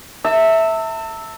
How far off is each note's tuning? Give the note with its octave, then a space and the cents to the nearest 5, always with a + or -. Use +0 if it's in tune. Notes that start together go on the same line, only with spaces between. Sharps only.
E5 -10 A5 +40